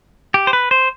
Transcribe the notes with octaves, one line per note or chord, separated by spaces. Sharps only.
G4
C5
B4
C5